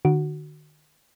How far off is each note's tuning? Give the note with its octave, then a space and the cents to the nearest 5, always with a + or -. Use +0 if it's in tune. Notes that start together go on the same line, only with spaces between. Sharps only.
D3 +45 F#4 +0